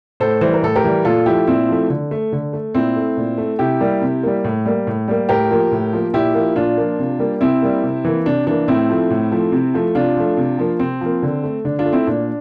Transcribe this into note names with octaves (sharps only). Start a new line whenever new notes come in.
A2 A4 C5
E3 G3 C5
A#4
A2 A4
G4 A#4
E3 G3
A#2 F4 A4
F3 A3 E4 G4
A#2 C4 E4
F3 A3
D3
A3
D3
A3
A#2 C4 E4
A3
A#2
A3
C3 E4 G4
G3 A#3
C3
G3 A#3
A2
G3 A#3
A2
G3 A#3
A2 G4 A#4
F3 A#3
A2
F3 A#3
A#2 E4 G4
F3 A#3
A#2 D4 F4
F3 A#3
C3
G3 A#3
C3 C4 E4
G3 A#3
C3
E3 A#3
C3 D4
E3 A#3 D4
A2 C4 E4
F3 A3
A2
F3 A3
C3
F3 A3
C3 D4 F4
F3 A3
C3
F3 A#3
C3 C4
F3 A#3
D3
A3
D3 D4
D4 F4
A3
C4 E4
A#2 D4